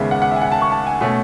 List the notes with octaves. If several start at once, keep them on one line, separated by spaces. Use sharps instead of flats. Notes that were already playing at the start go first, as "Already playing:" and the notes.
Already playing: D#2 C#3 G#3 B3 E5
F#5
F#5
E5
G#5
F#5
A5
C#6
A5
G#5
B2 A3 C#4